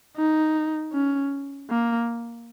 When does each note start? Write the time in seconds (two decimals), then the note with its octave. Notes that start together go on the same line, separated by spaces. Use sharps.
0.17 D#4
0.93 C#4
1.70 A#3